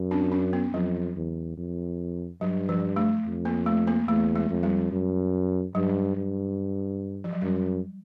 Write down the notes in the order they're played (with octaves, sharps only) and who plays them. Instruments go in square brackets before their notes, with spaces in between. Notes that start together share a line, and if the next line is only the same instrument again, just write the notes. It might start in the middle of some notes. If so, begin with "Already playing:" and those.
Already playing: [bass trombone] F#2
[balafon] C4 D4
C#4
B3
[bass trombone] F2 [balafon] F#3
[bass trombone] E2
F2
[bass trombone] G2 [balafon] F#3
[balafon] F3
A3
[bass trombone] F2
[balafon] A#3
A3
A#3
[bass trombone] E2 [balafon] A3
[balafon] G#3
[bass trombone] F2
[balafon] G3
[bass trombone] F#2
[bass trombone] G2 [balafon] F#3
[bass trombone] G2
[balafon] F3
F#3
[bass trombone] F#2 [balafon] G3